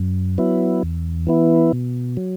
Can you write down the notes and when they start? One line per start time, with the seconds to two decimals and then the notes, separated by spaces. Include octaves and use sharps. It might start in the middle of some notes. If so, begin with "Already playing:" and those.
Already playing: F#2
0.38 F#3 B3 E4
0.83 E2
1.27 E3 B3 E4
1.73 B2
2.17 F#3